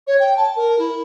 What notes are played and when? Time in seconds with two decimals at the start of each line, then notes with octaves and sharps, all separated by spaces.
0.07 C#5
0.20 G5
0.37 A5
0.56 A#4
0.79 E4